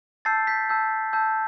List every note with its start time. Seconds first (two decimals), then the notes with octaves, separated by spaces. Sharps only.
0.25 A5 E6 G6 A6 C7
0.47 G6 B6
0.69 A5 E6 G6
1.13 A5 E6 G6